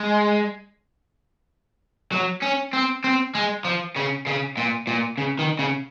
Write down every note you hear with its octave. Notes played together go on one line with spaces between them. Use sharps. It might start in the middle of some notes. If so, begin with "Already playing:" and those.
Already playing: G#3
F#3
C#4
C4
C4
G#3
F3
C#3
C#3
A#2
A#2
C#3
D#3
C#3